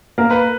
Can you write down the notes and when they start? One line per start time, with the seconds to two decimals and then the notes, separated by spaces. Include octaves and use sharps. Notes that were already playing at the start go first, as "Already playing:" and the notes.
0.18 A#3 A#4
0.31 B4